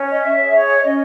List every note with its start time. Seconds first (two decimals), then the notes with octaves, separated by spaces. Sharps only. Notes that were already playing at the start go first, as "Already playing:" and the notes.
Already playing: C#4
0.11 D#5
0.20 E5
0.36 G#4 C#5
0.51 C#5
0.83 C#4 D#5